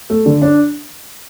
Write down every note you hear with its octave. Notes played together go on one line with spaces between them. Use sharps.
A3
D3
D4